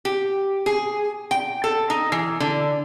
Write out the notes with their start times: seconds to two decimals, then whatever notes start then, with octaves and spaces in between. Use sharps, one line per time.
0.05 G4
0.66 G#4
1.31 G5
1.64 A4
1.90 D#4
2.12 E3
2.40 D3